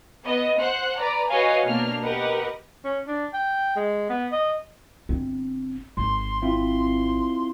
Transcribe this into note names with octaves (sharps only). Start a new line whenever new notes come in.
B3 D#5
C5 F#5 F#6
B4 D5 A#5
F#4 B4 C#5 D#5 F5 G#5
B2 A#3 D4 F6
G4 A#4 B4 D#5 F#5
C#4
D4
G5
G#3
B3
D#5
G1 C4
G#1 C6
C4 E4 F4